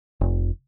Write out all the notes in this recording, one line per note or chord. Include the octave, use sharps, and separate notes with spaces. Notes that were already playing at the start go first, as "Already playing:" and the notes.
F1